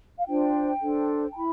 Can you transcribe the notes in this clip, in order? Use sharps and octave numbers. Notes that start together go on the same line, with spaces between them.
F5
D4 F4 C5 G5
D4 A4 C5
A5
E4 B5